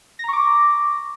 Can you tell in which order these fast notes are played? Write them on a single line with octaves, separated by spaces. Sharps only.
A#6 A#5 C#6 D6